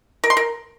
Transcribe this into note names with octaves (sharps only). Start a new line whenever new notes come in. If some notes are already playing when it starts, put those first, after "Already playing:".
A#4
C6
A#4